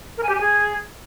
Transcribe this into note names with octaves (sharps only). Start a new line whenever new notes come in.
A#4
G#5
G4
G#5
G#4